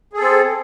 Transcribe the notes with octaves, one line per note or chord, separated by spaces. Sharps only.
C4 G#4 A4